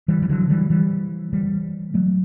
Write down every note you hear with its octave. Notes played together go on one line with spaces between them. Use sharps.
E3 G3
E3
D3 F#3
E3 G3
E3 G3
E3 G3
F#3 A3